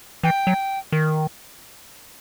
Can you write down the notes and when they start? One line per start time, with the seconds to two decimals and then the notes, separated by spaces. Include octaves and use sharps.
0.23 E3 G5
0.47 F#3
0.92 D#3